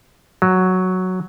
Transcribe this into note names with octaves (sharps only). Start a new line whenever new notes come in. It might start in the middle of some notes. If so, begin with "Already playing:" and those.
F#3